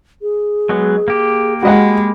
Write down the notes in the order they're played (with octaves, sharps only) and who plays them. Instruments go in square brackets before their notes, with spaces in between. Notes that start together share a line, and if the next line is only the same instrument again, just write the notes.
[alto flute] G#4
[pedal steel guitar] F#3 G#3 B3
A#3 G4
[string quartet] G#3 [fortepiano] F#4 D#5 F#5 [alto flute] B5